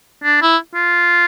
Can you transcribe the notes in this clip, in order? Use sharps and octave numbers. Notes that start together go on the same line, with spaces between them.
D4
E4
F4